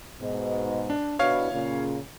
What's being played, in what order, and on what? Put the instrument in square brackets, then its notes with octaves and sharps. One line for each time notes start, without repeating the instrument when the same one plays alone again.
[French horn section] G#2 B2
[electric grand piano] D4
[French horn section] B2 D4 E4 [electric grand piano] C#5 F5
[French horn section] A#2 C#3